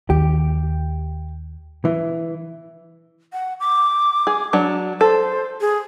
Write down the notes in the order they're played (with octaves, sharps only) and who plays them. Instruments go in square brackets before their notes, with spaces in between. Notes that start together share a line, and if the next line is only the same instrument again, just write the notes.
[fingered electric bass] D#2 D#3 [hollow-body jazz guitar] G4
[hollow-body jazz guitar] E3
[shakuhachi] F#5
D6
[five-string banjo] G#4
F#3 D4
[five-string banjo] A4 [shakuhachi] C5
[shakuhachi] G#4